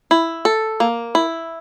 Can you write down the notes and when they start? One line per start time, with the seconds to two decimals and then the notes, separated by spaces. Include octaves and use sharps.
0.11 E4
0.45 A4
0.80 A#3
1.15 E4